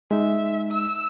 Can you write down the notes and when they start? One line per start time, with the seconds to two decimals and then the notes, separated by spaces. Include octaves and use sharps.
0.11 G#3 D#4 E5
0.71 E6